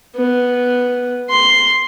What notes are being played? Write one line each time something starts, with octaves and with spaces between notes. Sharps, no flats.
B3
C6